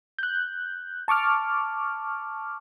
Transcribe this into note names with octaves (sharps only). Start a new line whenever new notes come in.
F#6 G6
A5 C#6 D6 F6